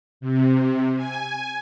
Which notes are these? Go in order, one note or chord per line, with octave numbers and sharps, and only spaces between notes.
C3
G#5